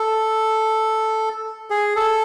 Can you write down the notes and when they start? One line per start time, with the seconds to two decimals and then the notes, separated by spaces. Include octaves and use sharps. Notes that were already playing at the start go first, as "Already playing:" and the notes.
Already playing: A4
1.70 G#4
1.96 A4